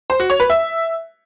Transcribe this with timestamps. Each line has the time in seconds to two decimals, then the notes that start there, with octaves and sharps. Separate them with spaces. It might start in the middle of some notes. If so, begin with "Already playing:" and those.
0.10 C5
0.20 F#4
0.30 C#5
0.40 B4
0.50 E5